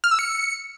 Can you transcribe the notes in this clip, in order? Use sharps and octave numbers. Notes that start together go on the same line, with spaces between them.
F6
E6
C#7